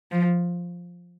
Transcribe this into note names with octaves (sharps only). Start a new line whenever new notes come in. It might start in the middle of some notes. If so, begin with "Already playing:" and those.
F3